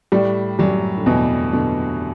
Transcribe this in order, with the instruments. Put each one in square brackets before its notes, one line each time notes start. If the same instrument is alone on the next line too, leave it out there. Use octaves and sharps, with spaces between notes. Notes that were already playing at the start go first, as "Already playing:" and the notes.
[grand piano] A2 A3 [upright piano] G3
[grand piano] F#2 F#3 [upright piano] G3
[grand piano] D3
[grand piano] E2 E3 [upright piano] B2
[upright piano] B2 [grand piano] D3